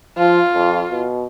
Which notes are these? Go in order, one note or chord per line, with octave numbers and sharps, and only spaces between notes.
F3 F4
F2
B2